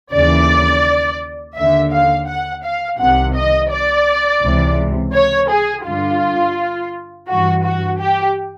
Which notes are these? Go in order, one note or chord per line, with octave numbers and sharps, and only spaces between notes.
D#2 C#3 E3 D5
D#2 D3 E5
F5
F#5
F5
C2 C3 D#3 F#5
D#5
D5
C#2 C3 E3
C#5
G#4
G2 D3 F4
G2 E3 F#4
F#4
G4